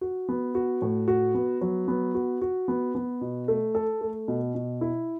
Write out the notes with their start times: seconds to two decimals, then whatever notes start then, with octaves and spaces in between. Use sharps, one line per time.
0.01 F#4
0.29 B3
0.55 F#4
0.82 A2
1.08 F#4
1.35 B3
1.61 F#3
1.88 B3
2.15 F#4
2.42 F#4
2.68 B3
2.95 B3
3.21 B2
3.48 A3
3.75 A4
4.01 A3
4.28 B2
4.55 B2
4.81 E4